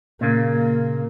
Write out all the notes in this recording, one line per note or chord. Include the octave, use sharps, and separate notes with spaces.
A#2 C#3 A#3